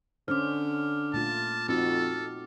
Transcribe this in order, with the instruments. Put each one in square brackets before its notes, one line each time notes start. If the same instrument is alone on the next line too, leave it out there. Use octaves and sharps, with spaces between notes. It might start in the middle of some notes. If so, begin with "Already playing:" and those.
[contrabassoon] D3 [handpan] C#4 D4 C5 [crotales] D6 F6
[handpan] A#2 A3 F4 [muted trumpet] A5
[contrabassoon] F2 [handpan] C4 D#4 F#4 [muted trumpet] A4